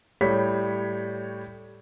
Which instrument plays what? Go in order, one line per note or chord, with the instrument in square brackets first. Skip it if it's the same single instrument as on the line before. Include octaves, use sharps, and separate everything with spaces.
[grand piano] A2 G3 C#5 B6